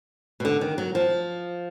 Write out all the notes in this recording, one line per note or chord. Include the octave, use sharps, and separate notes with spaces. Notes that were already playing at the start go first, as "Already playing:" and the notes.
B2
D3
D#3
F#3
F3